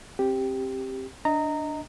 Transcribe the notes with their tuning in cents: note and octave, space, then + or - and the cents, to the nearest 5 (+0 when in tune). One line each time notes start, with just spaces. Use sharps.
C4 +25 G4 +0
D4 +0 D#5 +15 A#5 -15